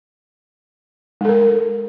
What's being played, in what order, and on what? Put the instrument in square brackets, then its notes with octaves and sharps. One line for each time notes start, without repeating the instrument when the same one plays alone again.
[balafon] G#3
A4
A#4